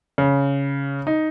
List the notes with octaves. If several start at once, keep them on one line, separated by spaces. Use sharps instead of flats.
C#3
D#4